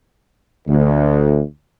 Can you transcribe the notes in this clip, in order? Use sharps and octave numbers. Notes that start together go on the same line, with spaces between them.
D2